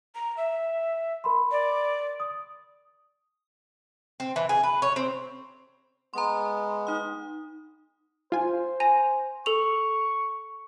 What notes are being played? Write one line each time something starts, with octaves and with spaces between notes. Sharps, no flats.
A#5
E5
A#4 B5 C6
D5
D#6
C4
E3
G#4
B4
C#5
C4
G#3 B3 A#5 C6
D#4 D#6
F4 C5 G#5
G#5 A#5
A4 C#6 F7